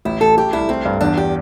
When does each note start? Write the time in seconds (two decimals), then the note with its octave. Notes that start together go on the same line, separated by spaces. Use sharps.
0.05 A1 E4
0.21 A1 A4
0.37 A3 G4
0.53 C2 E4
0.69 A3 C4
0.85 G2
1.01 E2 D4
1.17 G4